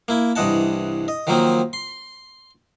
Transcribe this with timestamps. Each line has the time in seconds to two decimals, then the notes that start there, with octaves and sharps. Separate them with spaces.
0.08 A#3 E4
0.36 C2 G2 E3 D#5 F#5 A5
1.08 D#5
1.27 D#3 F3 F#3 A#3 C4 D#4
1.73 C6